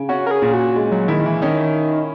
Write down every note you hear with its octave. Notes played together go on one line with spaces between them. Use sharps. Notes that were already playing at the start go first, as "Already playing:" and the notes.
Already playing: C#3
C#4 F#4
A#4
G#4
A#2
F#4
G#3
F#3
D#3 E4
D#3
E3
D#3 C#4